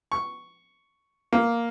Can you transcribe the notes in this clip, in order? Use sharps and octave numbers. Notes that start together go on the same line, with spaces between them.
C#6
A#3